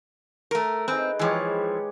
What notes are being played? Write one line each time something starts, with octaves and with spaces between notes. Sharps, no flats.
A3 A#4
C4 D#4 G#4 B4
E3 F3 G#3 G4 C#5